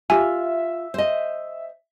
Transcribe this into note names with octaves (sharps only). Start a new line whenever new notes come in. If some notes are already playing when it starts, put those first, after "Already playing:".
F4 G4 E5 G#5
C5 D#5